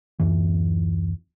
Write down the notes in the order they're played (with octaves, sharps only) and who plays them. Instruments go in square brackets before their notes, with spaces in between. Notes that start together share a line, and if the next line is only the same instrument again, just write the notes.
[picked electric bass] D1 F#2 E3